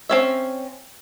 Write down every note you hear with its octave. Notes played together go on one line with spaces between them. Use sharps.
C4 C#4 E5